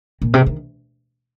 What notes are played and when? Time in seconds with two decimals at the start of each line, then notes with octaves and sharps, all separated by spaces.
0.22 A#2
0.34 C3
0.46 D#3